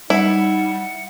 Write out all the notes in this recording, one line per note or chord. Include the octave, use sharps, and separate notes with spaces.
G3 D#4 E4 F#5